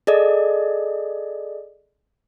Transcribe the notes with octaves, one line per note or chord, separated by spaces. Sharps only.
G#4 A4 D5 D#5